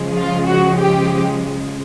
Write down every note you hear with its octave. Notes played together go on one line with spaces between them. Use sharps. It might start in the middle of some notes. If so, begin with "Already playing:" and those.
Already playing: C#3 F3 G#3
F4
F#4
G4